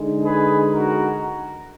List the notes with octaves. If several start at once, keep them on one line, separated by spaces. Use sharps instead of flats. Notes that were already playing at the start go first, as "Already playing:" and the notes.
Already playing: D3 G#3 D#4
G#4 B4
F#4 A#4